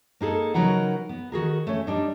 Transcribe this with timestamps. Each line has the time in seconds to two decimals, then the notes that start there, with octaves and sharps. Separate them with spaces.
0.21 A#3 D#4 G#4 A4
0.54 C#3 F#3 D#4 A#4 B4 F#5
1.09 B3
1.32 D#3 F#4 G#4 A#4
1.67 A3 C#4
1.87 G3 D4 D#4